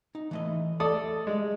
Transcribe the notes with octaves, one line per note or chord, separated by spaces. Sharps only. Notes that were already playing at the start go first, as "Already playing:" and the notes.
D#4
E3 A3 D#5
A3 A4 D5 D#6
G#3